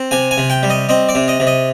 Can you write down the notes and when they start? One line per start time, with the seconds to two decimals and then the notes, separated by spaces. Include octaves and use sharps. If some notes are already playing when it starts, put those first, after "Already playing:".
Already playing: C4
0.11 C3 G#5
0.31 G#5
0.38 C3
0.50 G5
0.63 G3
0.70 D#5
0.89 C4 D#5
1.09 D5
1.15 C3
1.28 D#5
1.40 C3
1.47 D#5